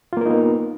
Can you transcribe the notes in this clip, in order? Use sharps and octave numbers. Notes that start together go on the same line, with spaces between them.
A#3 B3 D#4 F4 A#4